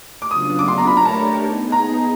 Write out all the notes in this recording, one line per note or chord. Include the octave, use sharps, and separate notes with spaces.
D6
C#3 F#3 B3 D4 F4 D#6
D6
C6
A#5
A3 D4 G4 A#4 C#5 B5
A#5
A5
B3 D#4 G#4
A#5